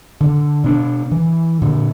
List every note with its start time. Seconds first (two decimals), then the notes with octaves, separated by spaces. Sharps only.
0.20 D3
0.64 B2 D4
1.11 E3
1.62 A#2 D3